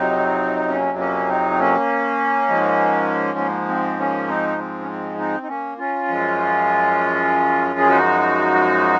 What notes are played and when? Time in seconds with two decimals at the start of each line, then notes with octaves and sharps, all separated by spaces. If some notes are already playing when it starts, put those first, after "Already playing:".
Already playing: F2 C3 F#3 C4 D#4
0.68 A#3 C#4
0.98 A#3 C#4
1.28 C4 D#4
1.51 C4
1.59 A#3 C#4
2.48 G#2 F3 G#3
3.38 A#3
3.68 C4
3.98 A#3 C#4
4.28 C4 D#4
4.58 C4
4.81 C#4
4.88 C4
5.18 C4 D#4
5.43 D#4
5.48 A#3 C#4
5.78 C#4 F4
6.08 F#2 F3 G#3
7.79 G#4
7.88 D#4 F#4